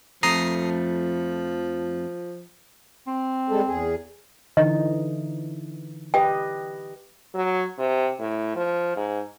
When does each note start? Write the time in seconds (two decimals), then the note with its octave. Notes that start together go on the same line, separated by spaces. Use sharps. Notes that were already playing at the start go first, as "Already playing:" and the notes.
0.23 F2 F3 A3 A#5 D#6 C7
3.07 C4
3.50 G3 G#3 A4
3.67 E2 G#4
4.57 D3 E3 D#4 D#5
6.14 G4 B4 D#5 G5
7.35 F#3
7.79 C3
8.19 A2
8.56 F3
8.96 G#2